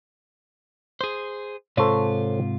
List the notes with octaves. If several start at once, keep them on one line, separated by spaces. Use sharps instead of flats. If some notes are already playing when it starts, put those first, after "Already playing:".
G#4 C5
G#2 C3 F4 A4 C5 C#5